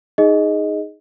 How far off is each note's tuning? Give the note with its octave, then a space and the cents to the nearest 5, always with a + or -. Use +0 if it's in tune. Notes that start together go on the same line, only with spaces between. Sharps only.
D#4 +0 G#4 +0 D#5 +5